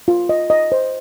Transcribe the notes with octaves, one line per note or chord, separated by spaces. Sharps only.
F4
D#5
D#5
C5